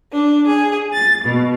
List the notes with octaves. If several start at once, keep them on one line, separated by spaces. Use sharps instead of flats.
D4
G#4
A6
B2